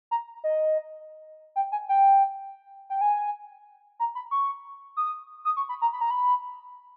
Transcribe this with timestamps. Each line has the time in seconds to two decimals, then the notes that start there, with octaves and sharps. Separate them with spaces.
0.11 A#5
0.44 D#5
1.56 G5
1.72 G#5
1.89 G5
2.90 G5
3.01 G#5
4.00 A#5
4.15 B5
4.31 C#6
4.97 D#6
5.45 D#6
5.56 C#6
5.69 B5
5.82 A#5
5.93 B5
6.01 A#5
6.11 B5